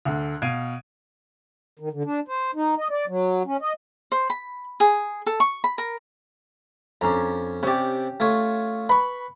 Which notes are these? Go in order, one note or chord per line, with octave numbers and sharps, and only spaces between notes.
D2 D3
B2 F5 G#6 C7 D7 D#7
D#3
D3
D4
C5
D#4
D#5
D5
F#3
C#4
D#5
C5
B5
G#4
A4
C#6
B5
A#4
F2 C#4 D4 A#5
C3 C#4 G4 D5
A3 F4 C#5
B4 B5 C#6